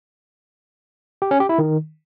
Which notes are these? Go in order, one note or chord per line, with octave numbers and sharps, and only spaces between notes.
G4
C#4
G4
E4
D#3